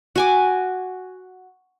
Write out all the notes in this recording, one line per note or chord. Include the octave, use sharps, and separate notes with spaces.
F#4 G#5 D6